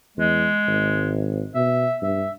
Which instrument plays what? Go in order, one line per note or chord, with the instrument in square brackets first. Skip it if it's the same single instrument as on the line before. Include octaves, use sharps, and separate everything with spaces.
[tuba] E2 [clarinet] G#3
[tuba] G#1
[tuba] B2 [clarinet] E5
[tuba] G2 [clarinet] E5